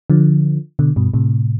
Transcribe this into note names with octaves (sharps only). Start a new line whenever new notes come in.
D3 F3
B2 D3
G2 B2
A2 C3